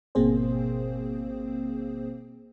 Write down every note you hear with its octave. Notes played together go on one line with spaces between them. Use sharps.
G#1 B2 A#3 C4 G#4 C5